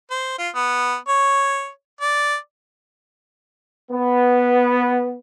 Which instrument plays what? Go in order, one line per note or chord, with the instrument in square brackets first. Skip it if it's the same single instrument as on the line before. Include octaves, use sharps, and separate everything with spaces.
[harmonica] C5
F4
B3
C#5
D5
[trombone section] B3